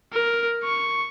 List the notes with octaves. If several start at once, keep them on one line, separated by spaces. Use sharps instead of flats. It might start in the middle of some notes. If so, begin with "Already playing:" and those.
A#4
C#6